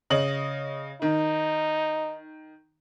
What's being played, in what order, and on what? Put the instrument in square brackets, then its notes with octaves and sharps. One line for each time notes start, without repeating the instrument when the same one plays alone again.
[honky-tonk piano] C#3 D#5 F#7
[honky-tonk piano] D#3 [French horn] D#4